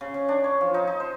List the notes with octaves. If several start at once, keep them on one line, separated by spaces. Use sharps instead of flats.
C#3
C#3
D4
C#5
F3
D#4
D#4
C5